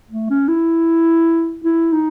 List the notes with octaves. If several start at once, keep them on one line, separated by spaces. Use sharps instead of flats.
A3
C#4
E4
E4
D#4